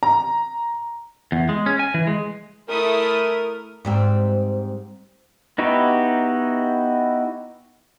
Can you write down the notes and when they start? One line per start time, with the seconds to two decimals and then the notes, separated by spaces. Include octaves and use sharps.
0.03 A#5
1.32 E2
1.49 G#3
1.66 C#4
1.79 G#5
1.94 E3
2.07 G#3
2.69 A3 E4 A#4 D#6
3.85 G#2 G3 C4
5.58 B3 D#4 E4 F#4 G4